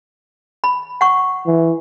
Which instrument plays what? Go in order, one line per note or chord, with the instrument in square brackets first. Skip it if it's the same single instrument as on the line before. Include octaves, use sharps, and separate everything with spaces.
[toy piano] B5
F#5 C#6
[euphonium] E3